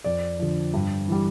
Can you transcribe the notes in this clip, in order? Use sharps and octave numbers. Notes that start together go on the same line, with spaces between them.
F2 D5
D3 F3
G2
E3 G3